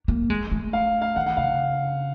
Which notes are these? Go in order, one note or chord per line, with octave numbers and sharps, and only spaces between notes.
A#3
G#3
A3
F5
F5
D#3 F#5
F#5
C#3 F5